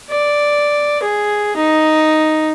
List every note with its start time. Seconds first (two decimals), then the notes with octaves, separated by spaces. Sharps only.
0.11 D5
1.03 G#4
1.56 D#4